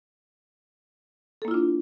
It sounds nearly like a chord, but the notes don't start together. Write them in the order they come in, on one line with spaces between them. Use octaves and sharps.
A4 A#3 E4 F4 D4